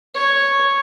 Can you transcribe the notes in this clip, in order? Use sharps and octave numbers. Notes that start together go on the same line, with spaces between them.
C#5